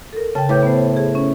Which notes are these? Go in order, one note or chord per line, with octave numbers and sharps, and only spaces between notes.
A4 A#4
C#3 G5 A5
A2 B4 D6 G6
B3 C5
G#4
C#4